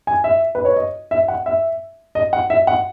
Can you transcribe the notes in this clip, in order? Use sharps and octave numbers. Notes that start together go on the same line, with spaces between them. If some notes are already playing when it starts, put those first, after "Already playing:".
G#5
E5
B4
C#5
D#5
E5
F#5
E5
D#5
F#5
E5
F#5